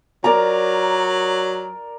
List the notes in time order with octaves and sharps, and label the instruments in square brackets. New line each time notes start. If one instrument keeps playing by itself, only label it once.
[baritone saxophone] F#3 [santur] A#4 D5 A#5